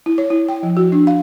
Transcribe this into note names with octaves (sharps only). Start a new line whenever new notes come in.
E4
C#5
E4
G5
F3
F#4
D4
F5